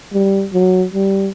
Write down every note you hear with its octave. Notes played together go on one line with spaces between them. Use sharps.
G3
F#3
G3